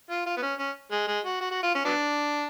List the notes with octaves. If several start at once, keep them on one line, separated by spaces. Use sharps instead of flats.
F4
F4
B3
C#4
C#4
G#3
G#3
F#4
F#4
F#4
F4
C#4
F#3 B3 D4